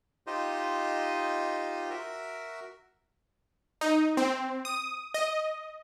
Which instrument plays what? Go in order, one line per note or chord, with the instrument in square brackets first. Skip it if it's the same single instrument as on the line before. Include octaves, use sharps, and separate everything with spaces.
[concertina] D#4 F4 G4 C5 D#5
F#4 A#4 E5
[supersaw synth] D#4
C4
D#6
D#5